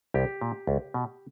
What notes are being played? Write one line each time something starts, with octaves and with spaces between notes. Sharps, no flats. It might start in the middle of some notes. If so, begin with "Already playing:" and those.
C2 G4
A#2
C#2
B2